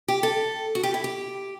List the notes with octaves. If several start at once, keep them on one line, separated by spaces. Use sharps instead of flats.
G4
A4
F#4
G4
E4
G4